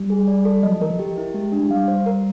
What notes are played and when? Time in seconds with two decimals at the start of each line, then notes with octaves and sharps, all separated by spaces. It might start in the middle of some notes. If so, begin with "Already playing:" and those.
Already playing: G3
0.10 G#4
0.27 D5
0.45 A4
0.63 F#3 D#5
0.72 F3
0.81 E3 A#4
0.90 F3
0.99 G4
1.18 E4
1.34 G#3 G4
1.52 D4
1.63 G#3
1.70 G3 F5
1.88 C5
2.06 A#4